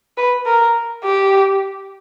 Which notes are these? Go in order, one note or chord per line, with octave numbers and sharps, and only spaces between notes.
B4
A#4
G4